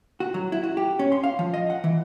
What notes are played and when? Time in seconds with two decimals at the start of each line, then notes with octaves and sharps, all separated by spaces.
0.20 F#4
0.34 F#3
0.52 E4
0.64 F#4
0.77 G4
0.99 C#4
1.12 C6
1.24 F5
1.39 F3
1.54 D#5
1.70 F#5
1.84 E3